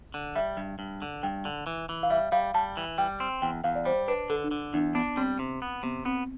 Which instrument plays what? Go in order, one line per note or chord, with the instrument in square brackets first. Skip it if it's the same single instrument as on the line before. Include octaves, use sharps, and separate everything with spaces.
[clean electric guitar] D3
[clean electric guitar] G3 [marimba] E5
[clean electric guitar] G2
G2
D3
[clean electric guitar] G2 [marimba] G5
[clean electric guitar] D3
E3
E3
[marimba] F5
[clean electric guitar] G3 [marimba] E5
[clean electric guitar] G3 [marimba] F5
[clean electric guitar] G3 [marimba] A5
[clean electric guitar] E3
[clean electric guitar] G3 [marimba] G5
[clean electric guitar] C4
[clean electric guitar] E2 [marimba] G5
[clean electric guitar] E2 [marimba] F5
[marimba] D5
[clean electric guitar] G3 [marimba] C5
[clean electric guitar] D4 [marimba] B4
[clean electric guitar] D3 [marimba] A4
[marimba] D4
[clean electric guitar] D3
[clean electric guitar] E2 [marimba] D4
[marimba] B3 [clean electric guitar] D4
[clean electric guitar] G3 [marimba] C4
[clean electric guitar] C3
B3
[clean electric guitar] C3 [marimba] B3
[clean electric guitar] B3 [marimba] C4